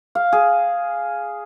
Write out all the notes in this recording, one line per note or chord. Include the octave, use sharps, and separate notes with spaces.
F5
G#4